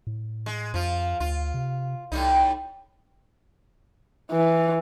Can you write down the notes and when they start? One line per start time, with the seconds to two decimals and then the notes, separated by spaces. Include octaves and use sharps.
0.07 A2
0.46 G#3
0.74 F2 F3 F4
1.20 D2 F4
1.54 C3
2.12 C2 A2 G3 D#4
4.32 E3